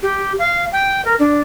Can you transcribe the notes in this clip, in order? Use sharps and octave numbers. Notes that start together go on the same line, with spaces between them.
G4
F5
G5
A#4
D4